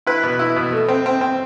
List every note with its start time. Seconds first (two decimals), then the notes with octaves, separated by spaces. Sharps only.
0.07 E4 B4
0.23 B2
0.39 E4
0.56 B2
0.72 A3
0.88 C4
1.06 C4
1.21 C4